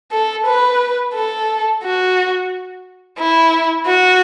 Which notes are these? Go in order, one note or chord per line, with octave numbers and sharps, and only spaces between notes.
A4
B4
A4
F#4
E4
F#4